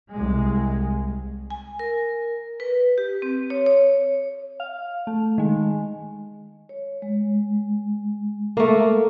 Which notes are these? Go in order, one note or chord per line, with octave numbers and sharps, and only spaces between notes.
C2 G#3
G#5
A#4
B4
G4
C4
C#5
C#5
F5
A3
D#3 G#3
C#5
G#3
A3 A#3